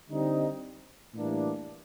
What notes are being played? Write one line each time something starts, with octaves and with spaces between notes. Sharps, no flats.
D3 G3 C4 D#4
A2 E3 G3 A#3 D4